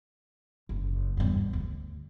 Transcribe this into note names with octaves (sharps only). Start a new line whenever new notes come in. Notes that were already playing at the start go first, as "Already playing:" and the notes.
F#1
E2 G2
D2